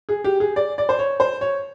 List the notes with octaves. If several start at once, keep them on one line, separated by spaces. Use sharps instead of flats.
G#4
G4
G#4
D5
D5
C5
C#5
C5
C#5